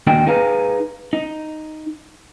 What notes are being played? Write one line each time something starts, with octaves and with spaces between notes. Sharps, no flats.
D#2 A#3 D4 D#4 F#4 G5
D#4 G#4 B4 F5 A#5
D#4